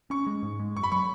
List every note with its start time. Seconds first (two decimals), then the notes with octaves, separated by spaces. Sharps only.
0.10 C#4 C#6
0.27 G#3
0.43 G#2
0.59 G#3
0.76 F#2 C#6
0.83 B5
0.92 F#3 C#6